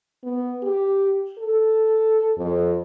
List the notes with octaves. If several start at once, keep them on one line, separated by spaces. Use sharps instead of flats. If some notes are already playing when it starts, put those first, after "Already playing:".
B3
G4
A4
F2